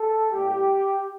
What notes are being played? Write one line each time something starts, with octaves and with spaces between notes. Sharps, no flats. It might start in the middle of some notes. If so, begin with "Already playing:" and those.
Already playing: A4
A2 G3 A#3 G4